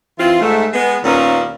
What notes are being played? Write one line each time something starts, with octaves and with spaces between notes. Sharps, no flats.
E3 C4 F4
G#2 A3
G#3 B3
D#2 A#2 A#3 B3 C#4